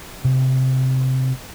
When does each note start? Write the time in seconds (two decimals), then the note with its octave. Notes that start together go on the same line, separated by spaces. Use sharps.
0.24 C3